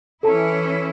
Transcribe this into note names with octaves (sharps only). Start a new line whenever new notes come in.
E3 C#4 E4 A4 A5 A#5